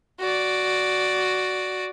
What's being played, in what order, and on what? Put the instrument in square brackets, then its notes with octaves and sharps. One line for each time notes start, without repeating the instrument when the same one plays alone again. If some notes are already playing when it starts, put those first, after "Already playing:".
[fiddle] F#4 D5